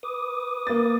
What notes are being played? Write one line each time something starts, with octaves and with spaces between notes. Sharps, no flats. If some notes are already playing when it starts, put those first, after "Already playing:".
B4 D6 D#6
A#3 A6